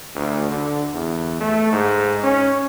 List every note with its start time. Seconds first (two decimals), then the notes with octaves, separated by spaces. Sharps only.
0.15 D2
0.51 D3
0.94 E2
1.40 A3
1.72 G#2
2.23 C#4